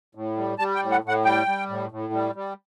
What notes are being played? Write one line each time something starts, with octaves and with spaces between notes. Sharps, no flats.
A2
G3
G3 A5
G5
A2
F#5
A2 F#5
G3 G5
G3
A2
A2
G3
G3